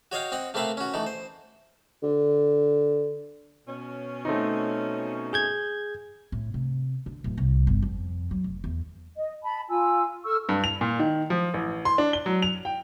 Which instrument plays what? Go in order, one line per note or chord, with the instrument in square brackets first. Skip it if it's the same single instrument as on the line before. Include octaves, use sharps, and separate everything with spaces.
[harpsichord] F#4 C#5 D#5 F5 G5
C4 D#5 F#5
A3 A#3 C4 B4 E5 F5
C#4 F#4
E3 A3 D#4
C5
[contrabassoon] D3
[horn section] B2 C#4
[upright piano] A3 C4 D#4
[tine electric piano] G#4 G6 G#6
[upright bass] A2
C3
D3
D1
C2
G1
F2
F#3
F1
E2
[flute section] D#5
A5 B5
F4 G#5 E6
A4 C#6 E6 F6
[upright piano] G2
F7
A#2
D#3
F3
A1
C6
D4
G7
F#3
F7
G5